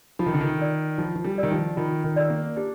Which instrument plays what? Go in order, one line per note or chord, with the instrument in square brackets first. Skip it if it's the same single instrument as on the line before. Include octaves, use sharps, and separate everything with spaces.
[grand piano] F3 [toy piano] F4
[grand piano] D#3
D3
D#3
[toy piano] A#4 D5
[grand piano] F3 [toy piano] F4
[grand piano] F3
G3
[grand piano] D#3 [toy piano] A#4 D5
[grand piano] F3
[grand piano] D#3 [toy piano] F4
[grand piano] D#3
[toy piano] A#4 D5
[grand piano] A#3
[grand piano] D4 [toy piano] G4